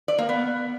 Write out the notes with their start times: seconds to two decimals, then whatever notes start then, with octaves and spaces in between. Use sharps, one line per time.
0.08 D5
0.18 A#3
0.29 B3